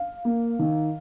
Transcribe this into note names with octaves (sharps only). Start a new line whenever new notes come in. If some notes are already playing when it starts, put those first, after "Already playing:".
Already playing: F5
A#3
D#3